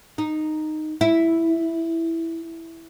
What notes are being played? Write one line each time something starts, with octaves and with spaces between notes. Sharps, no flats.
D#4
E4